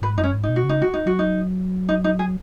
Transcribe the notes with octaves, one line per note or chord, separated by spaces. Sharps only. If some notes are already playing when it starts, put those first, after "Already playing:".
G#2 B4
F#2 D#4
C#4
G#2
D#4
B2
F#4
C#3
D#4
F#4
D#4
F#3 F#4
D#4
D#4
D#4
G#4